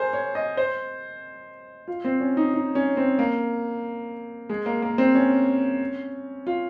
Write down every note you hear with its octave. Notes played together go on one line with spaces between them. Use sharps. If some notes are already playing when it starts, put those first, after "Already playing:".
Already playing: G#4 A#4 C5
C#5
D#5
C5
F4
C4
C#4
D#4
D#4
C#4
C4
A#3
G#3
A#3
A#3
C4
C#4
F4